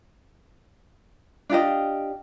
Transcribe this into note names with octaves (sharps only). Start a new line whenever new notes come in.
D4 F4 G4 D#5